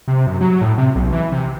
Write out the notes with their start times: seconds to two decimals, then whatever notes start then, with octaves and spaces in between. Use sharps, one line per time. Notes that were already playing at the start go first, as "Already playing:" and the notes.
0.08 C3
0.27 F#2
0.41 F#3
0.61 A2
0.78 C3
0.95 B1
1.13 E3
1.32 C3